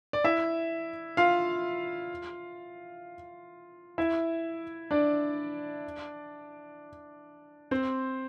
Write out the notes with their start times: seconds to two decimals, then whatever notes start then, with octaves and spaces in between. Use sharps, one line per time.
0.13 D5
0.24 E4 E5
1.17 F4 F5
3.98 E4 E5
4.91 D4 D5
7.71 C4 C5